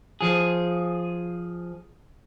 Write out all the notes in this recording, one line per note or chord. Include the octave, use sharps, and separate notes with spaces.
F3 G#4